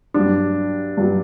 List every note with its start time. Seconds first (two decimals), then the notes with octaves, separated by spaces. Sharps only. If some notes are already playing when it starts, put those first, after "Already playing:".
0.14 G2 F#3 D4
0.97 G2 F#3